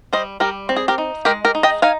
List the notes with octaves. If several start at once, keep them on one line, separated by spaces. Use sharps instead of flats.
G3 C5 D#5
G3 G4 A#4
C4
G#4
G4 A#4
D#4
G#3 G4 A#4
G4 A#4
D#4
D#5 G5
D#4 F5 G#5